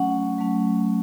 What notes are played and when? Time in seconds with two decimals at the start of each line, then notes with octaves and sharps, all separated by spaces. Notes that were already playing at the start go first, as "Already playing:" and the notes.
Already playing: F#3 A3 C#4 F#5
0.38 F#3 A3 C#4